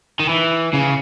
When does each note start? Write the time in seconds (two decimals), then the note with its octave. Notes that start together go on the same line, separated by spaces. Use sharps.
0.20 D#3
0.29 E3
0.73 C#3